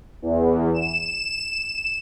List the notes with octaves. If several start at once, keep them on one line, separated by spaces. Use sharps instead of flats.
E2
E7